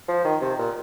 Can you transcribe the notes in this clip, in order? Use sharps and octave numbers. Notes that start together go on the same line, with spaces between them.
F3
D#3
C3
A#2